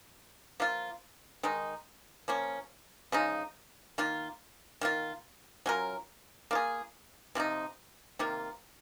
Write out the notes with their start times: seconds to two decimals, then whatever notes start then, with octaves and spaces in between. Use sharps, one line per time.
0.60 F3 A#3 F4
1.43 D#3 G#3 D#4
2.28 F3 A#3 C#4
3.12 C#3 F3 G#3 D#4
3.98 D#3 A#3 F4
4.81 D#3 A#3 F4
5.66 F#3 C#4 F4 A#4
6.51 A#3 F4 G#4
7.35 C3 F3 C4 D#4
8.19 C3 D#3 A#3 F4